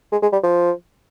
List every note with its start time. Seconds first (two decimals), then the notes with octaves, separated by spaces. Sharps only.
0.12 G#3
0.22 G#3
0.32 G3
0.43 F3